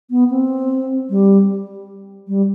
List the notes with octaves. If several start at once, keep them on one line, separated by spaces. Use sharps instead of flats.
B3
C4
G3
G3